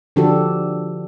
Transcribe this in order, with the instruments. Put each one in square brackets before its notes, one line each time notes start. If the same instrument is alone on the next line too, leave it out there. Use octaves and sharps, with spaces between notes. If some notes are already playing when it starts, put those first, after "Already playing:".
[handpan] D3 F3 D4 F#4 G4 A4